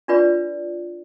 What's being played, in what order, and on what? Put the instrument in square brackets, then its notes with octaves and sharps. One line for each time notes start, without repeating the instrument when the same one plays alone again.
[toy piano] D4 F4 B4 D5